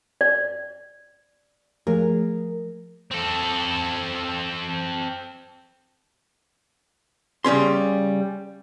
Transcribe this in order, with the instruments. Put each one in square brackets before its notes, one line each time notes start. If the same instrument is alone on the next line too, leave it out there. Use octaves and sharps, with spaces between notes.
[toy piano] D5
[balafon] F3 A3 [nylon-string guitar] G#4 A#4
[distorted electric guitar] C4 A4
[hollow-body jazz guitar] C#3 G3 C#4 C6